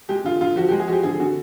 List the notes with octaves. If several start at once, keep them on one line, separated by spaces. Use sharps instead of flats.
G#3 G4
D3 F4
D3 F4
F3 F#4
G#3 G4
G#4
F3 F#4 G4
D3 G#4
D3 F#4